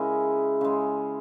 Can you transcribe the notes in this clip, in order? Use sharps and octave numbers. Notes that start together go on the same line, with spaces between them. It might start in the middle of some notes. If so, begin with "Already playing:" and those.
Already playing: C#3 G#3 E4 G#4 A#4
C#3 G#3